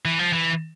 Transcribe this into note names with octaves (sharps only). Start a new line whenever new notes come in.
E3
F3
E3